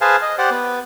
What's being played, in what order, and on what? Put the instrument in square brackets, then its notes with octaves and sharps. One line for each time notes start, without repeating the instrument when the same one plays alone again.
[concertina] G#4 B4 C5 F5 G#5 A5
D#5
G4 C5 D5 F#5
B3